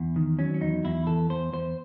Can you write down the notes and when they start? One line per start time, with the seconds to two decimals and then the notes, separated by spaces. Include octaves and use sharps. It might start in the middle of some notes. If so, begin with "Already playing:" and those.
Already playing: E2
0.16 D#3
0.39 F#3 C#4
0.54 C#4
0.61 E2 D#4
0.84 E2 E4
1.07 E3 A4
1.30 E2 C5
1.53 E2 C5